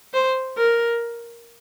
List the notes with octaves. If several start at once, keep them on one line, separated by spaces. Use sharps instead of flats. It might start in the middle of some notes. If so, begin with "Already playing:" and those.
C5
A#4